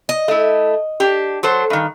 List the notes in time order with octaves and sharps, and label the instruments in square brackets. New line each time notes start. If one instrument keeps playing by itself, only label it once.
[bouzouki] D#5
[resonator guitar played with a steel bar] A3 E4
D4 G4
F#3 A4 C5
G2 D#3